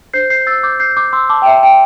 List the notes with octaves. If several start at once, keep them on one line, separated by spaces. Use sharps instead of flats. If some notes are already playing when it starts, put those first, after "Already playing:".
D4 C5 G6 C7
G6 C7
E6 A6
D6 G6
G6 C7
D6 G6
C6 E6
A5 D6
G5
E5
G5